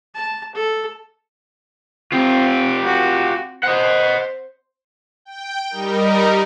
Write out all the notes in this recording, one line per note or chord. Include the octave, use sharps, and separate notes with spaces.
A5
A4
C4 F4 G4
F#4
C5 D#5 F#5
G5
G3 D#4 A#4